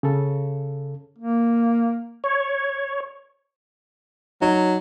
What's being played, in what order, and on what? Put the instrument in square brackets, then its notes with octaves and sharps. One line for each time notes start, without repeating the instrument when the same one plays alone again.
[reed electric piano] C#3 A4
[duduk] A#3
[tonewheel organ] C#5
[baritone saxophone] F#3 [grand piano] D#4